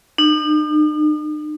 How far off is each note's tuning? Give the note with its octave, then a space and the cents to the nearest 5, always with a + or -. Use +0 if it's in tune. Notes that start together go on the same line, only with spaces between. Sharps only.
D#4 -45